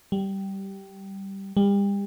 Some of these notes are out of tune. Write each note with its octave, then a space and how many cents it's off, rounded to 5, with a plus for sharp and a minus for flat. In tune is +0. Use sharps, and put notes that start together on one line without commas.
G3 -10
G3 +35